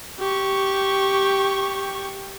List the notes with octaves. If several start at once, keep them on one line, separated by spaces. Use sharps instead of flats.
G4 C#6